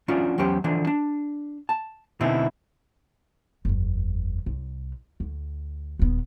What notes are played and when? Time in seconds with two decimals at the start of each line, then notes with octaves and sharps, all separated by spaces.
0.08 F3 C#4 D4 F4 F#4
0.38 E2 F#3 C#4 G4 C5
0.64 D3 E3 F3 D4
0.87 D4
1.69 A5
2.21 B2 D3 C4 D#4 E4
3.65 F#1 E2
4.46 C2
5.20 D2
5.99 D#1 B3